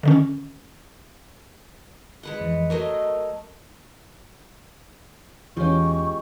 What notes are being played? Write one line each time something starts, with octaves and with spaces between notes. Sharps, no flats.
D3 D#3 C#4
G#3 B4 F#5
F2 E3
F#3 A3 A#4 D#5
E2 E3 G#3 C#4 F4 G4 C#6